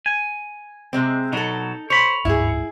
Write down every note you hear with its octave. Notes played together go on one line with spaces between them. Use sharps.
G#5
C3 G#3 C4
B2 F#3 D#4 A4
C5 C#5 B5
D1 G1 G#2 E4 G#4